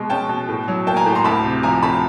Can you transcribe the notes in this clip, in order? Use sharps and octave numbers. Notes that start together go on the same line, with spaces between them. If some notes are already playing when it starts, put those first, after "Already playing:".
Already playing: B2 G#3
C#4 G5 A5
B2
A2
F#3
A#3 G5 A5
G#5 A#5
A2
A#5 C6
D2 A5 B5
C3
F3 G#5 A#5
D2 A5 B5